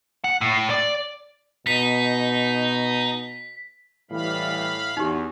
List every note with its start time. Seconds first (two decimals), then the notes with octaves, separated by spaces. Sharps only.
0.24 F#5
0.41 A2
0.70 D5
1.67 B2 D#4 B6
4.11 A2 E3 G3 F5 B5
4.97 E2 D#4 F#4 G4